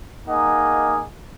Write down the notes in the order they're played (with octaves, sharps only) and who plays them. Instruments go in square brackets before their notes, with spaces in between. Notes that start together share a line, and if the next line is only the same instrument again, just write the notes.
[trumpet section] A#3 D#4 G#4 D#5 F#5